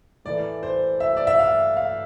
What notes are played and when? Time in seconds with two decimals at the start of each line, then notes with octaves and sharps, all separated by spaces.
0.25 A2 E3 A3 D5
0.63 C5
1.00 E5
1.17 D5
1.27 E5
1.39 F5
1.77 F5